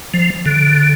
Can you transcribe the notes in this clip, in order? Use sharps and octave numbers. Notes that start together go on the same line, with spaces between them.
F3
D3